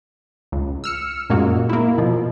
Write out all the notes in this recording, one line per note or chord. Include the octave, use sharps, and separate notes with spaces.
C#2
E6 F6 C#7
F#2 A#2 G#3 A#3 F#4
A#3 E4
B2 F3